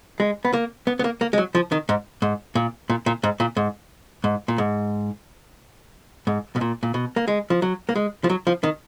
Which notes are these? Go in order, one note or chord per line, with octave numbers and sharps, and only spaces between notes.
G#3
B3
A#3
B3
B3
A#3
A#3
G#3
F#3
F3
D#3
G#2
G#2
A#2
A#2
A#2
G#2
A#2
G#2
G#2
A#2
G#2
G#2
B2
A#2
A#2
B2
A#3
G#3
F3
F#3
A#3
G#3
F3
F#3
F3
D#3